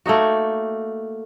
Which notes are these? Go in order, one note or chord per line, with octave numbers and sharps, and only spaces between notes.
A3 A#3 D#4 F#4